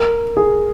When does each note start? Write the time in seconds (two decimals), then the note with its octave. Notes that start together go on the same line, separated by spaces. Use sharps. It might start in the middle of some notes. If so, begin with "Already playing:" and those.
Already playing: A#4
0.37 G#4